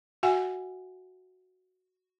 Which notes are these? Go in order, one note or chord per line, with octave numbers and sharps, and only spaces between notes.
F#4 E5 F#5 G#5